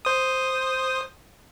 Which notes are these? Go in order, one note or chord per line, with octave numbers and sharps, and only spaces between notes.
C5 D#6